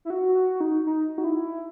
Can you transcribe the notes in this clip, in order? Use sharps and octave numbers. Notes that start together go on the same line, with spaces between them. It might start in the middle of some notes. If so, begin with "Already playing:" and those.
E4
F#4
F#4
D#4
D#4
F#4
E4